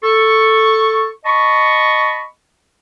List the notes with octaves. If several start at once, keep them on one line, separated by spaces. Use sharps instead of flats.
A4 C#6
D#5 A5 B5 C#6